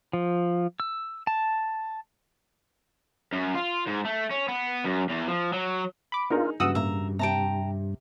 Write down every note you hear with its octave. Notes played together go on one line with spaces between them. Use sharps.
F3
E6
A5
F#2
F4
G#2
A3
C#4
B3
F#2
E2
F3
F#3
B5 D6
B3 D4 D#4 F4 G#4 A#4
G2 C#3 E3 F#3 F#4 F#5 D#6 E6
A2 A#3 E5 A#5
C3 G4 G5 A5 A#5